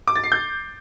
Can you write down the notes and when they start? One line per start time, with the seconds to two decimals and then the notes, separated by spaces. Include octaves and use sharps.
0.08 D6
0.16 A6
0.24 C7
0.32 G6